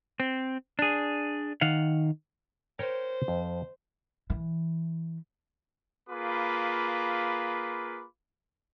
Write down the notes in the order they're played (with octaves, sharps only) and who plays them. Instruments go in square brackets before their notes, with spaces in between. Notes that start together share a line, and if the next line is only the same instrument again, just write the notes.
[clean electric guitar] C4
D4 G#4
D#3 F5 F#5
[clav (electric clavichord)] A#4 C#5 G5 [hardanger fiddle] C5
[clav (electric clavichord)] F2
[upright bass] E3
[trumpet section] A#3 F4 G#4 B4 B5 D6